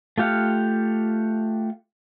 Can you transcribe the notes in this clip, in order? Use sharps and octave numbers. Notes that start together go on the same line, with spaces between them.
A3 F4 G4 F5 F#5